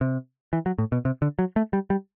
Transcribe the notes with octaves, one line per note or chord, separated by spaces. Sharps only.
C3
E3
F#3
A2
B2
C3
D3
F#3
A3
G3
G3